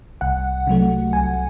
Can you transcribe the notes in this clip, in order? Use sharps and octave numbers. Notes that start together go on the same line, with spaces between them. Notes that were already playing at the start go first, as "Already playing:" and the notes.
C2 F#5
C3 F#3 A3
C2 G#5